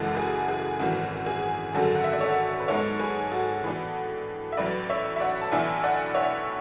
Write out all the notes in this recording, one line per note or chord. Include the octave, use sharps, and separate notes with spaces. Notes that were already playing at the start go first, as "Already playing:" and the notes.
Already playing: F#1 F#2 C#3 E3 G#3 F#4 A4
G#4
G#4
G#1 F#2 E3 F#4
G#4
G#1 F#2 D3 F#3 F#4 A4
F#5
E5
D5
A4 C#5
A4
B4
G#2 G#3 B3 A4 C#5
G#4 B4
F#4 A4
A2 E3 B3 D4
E5
A1 A2 F#3 B4 D5
C#5 E5
E5
D5 F#5
A5
B1 A2 E3 B3 D4 E5 G#5
D5 F#5
C#5 E5